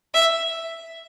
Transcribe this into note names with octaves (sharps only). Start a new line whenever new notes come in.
E5